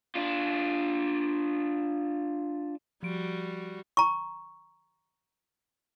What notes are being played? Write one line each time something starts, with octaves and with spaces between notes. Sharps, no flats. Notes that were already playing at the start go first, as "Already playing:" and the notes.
D4 F4
F3 G3 F#4 D7
A#5 C#6